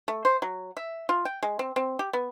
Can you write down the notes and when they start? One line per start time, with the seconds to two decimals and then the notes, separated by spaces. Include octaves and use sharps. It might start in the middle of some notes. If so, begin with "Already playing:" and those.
0.08 A3
0.25 C5
0.42 F#3
0.77 E5
1.09 F4
1.25 G5
1.43 G#3
1.59 C4
1.76 C4
1.99 G4
2.13 B3